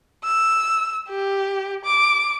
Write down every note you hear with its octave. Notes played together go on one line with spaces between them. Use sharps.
E6
G4
D6